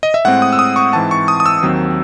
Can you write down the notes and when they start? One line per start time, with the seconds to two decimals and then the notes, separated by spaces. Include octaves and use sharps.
0.03 D#5
0.14 E5
0.25 A2 G#3 C4 F#5
0.42 D#6
0.53 E6
0.59 D#6
0.76 C#6
0.93 G#2 E3 C4 A5
1.11 C#6
1.28 D#6
1.40 D#6
1.46 E6
1.63 D#2 D#3 F#3 C4